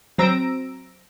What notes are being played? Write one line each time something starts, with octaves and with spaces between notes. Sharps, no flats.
F#3 C4 A#5 E6 A#6 D7